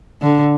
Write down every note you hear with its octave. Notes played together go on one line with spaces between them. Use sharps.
D3